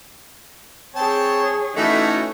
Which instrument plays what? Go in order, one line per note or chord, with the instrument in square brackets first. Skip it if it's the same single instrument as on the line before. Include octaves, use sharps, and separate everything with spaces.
[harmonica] C4 G5 A5 [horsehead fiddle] G#4 C#5
[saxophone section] E3 A3 [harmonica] C#4 D#4 A4 [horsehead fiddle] F#4